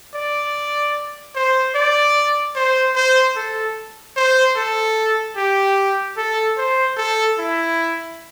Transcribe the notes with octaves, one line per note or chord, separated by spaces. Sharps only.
D5
C5
D5
C5
C5
A4
C5
A4
G4
A4
C5
A4
E4